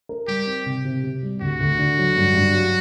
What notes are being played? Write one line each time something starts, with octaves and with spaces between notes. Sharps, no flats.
A#4
G3 G4
C4
C3
C3
C3
G3
D2 F#4
D2
D3
F#3
G2
G2
F#3